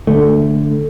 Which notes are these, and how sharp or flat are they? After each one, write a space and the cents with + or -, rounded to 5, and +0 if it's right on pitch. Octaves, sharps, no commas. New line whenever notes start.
D3 +0 A3 +0